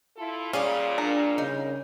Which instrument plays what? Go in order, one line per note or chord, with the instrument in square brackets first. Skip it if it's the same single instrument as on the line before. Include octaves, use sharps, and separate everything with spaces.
[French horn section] E4 F4 A4
[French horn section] A#2 G3 [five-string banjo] C#4 [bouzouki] F4 G#4 D5
[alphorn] D4 [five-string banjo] A#4
[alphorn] C#3 [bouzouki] D#4